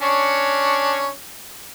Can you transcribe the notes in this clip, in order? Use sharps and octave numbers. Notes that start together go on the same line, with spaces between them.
C#4 D4 C#5